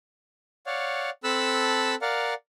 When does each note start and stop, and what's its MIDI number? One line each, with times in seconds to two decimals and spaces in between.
0.66 1.10 73
0.66 1.10 74
0.66 1.10 77
0.66 1.10 78
1.24 1.95 60
1.24 1.95 69
1.24 1.95 81
1.24 1.95 83
1.24 1.95 88
1.24 1.95 90
2.02 2.34 70
2.02 2.34 74
2.02 2.34 77
2.02 2.34 78